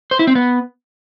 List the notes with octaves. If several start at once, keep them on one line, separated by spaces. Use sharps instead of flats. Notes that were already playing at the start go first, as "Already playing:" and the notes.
C5
E4
C4
B3